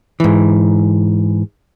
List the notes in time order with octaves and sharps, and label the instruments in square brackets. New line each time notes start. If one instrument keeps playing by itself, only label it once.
[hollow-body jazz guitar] G#2 E3